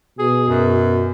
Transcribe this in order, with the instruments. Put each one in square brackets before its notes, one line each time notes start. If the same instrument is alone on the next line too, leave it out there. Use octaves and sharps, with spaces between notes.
[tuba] B2 [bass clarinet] G#4
[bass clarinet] F#2